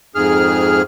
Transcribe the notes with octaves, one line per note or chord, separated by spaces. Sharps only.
F2 G#2 G#4 F6